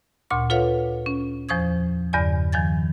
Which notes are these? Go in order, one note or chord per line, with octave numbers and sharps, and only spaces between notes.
D2 A#2 C6 C#6
F4 A4 B4 C#5 F5 F#5
C#4
E2 F3 C5 C#6 D#6 G#6
E2 G2 C#3 D5 G#5
D#3 F3 G#5 G#6 A6